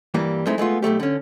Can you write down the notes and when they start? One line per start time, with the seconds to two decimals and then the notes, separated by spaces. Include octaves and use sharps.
0.14 G2 E3 G3 A#3
0.46 G#3 A3 C4 D#4 E4
0.58 G#3 A3 B3 F4
0.82 B1 G#2 A3 G4
1.00 D3 C#4